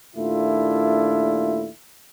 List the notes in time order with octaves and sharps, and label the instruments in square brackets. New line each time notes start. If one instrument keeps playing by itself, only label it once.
[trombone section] D#2 A#2 A3 D4 E4 F4